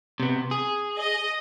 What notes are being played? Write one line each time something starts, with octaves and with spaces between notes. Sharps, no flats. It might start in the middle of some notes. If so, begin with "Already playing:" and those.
C3 B3
G#4
D#5